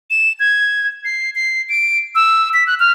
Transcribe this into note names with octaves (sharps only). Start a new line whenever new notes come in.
E7
G#6
C7
C7
D7
E6
B6
F#6
F6